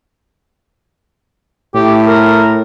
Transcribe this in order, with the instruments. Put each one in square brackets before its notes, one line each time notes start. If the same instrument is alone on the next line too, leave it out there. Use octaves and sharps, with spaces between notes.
[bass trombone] A2 [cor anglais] G4
[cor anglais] A#4